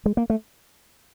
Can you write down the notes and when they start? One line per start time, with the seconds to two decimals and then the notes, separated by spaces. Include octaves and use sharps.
0.06 G#3
0.17 A#3
0.30 A3